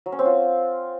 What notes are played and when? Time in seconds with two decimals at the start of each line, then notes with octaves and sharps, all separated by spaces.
0.06 F#3
0.12 C#4
0.19 C4
0.25 F4